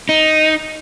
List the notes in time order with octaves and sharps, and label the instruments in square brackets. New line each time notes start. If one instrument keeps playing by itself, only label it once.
[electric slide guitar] D#4